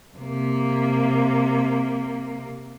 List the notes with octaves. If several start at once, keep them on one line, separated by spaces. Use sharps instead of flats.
C3 A#3